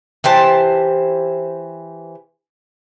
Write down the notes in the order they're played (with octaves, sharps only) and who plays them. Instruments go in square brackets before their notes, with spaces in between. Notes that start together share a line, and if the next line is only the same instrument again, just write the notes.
[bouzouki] E3 G4 C5 A5